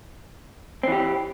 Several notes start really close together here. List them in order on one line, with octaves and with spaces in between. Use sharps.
C4 E3 G4